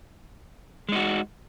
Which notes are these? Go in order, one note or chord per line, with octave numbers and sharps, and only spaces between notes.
G#3 D#4 F#4